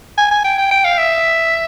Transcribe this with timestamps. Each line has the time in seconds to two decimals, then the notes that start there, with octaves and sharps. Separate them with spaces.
0.18 G#5
0.31 G#5
0.44 G5
0.58 G5
0.71 G5
0.85 F5
0.98 E5